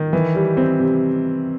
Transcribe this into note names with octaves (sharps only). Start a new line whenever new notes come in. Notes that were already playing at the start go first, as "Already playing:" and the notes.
Already playing: D#3
E3
G3
C4
C3